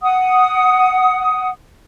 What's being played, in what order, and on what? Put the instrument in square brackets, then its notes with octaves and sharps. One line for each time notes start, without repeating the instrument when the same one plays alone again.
[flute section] F#5 D#6